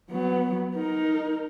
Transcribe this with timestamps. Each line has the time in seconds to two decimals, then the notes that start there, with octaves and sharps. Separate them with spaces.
0.11 F#3 B3
0.76 D#4 A#4